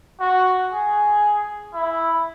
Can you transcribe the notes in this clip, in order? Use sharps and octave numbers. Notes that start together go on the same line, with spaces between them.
F#4
G#4
E4